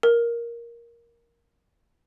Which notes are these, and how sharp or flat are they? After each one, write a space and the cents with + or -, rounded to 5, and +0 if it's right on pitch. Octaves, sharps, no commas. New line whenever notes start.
A#4 +10